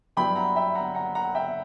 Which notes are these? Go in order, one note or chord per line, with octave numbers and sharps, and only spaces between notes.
G2 F#3 B3 E4 G5 B5
F#5 A#5
E5 G5
F#5 A#5
F#5 A#5
F#5 A#5
E5 G5